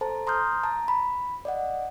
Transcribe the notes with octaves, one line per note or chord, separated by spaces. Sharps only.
A4 C5 A5 A#5
A#5 C6 D#6 F6 G6
A5 A#5
B5
D5 D#5 F#5